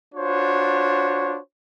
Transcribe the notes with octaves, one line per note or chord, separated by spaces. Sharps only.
D4 F4 F#4 C5 C#5